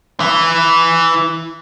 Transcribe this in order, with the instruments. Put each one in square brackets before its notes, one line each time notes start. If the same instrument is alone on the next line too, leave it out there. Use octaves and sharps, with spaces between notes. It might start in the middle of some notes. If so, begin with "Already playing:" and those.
[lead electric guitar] E3 E4